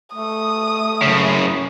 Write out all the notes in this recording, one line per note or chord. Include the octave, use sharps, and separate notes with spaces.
A3 D#6
F#2 C#3